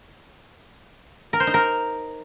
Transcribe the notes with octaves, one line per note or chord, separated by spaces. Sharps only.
A#4
C5
D#4
A#4